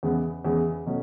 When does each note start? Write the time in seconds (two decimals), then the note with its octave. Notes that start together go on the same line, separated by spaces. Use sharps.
0.03 E2 C#3 G#3 B3
0.45 E2 C#3 G#3 B3
0.86 B2 F#3 A3 C#4